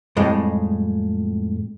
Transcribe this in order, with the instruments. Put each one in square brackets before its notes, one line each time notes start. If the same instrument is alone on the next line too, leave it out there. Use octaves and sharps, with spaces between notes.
[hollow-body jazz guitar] F2 A2 G3 G#3